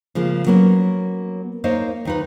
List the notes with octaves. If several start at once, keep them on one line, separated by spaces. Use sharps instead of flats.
C#3 F3 G#3 A#3
F#3 A#3 B3 C#4
A#3 D#4 C5 C#5 D#5 F5
D#2 D#4 B4